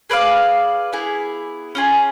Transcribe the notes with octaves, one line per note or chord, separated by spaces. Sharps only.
G#4 B4 D5 F5
B3 E4 G#4
C#4 F4 G#4